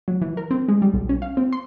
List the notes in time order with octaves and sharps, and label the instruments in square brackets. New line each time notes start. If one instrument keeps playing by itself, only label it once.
[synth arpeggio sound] F#3
E3
A#4
C4
G#3
G3
B1
C#4
F5
C4
C6